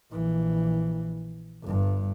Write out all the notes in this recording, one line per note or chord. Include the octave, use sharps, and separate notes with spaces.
A#1 E3
G1 G2